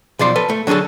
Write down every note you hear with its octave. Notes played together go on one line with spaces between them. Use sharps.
B1 F3 D5 C6
A4 B4
A3
D3 F#3 D4 G#4 A4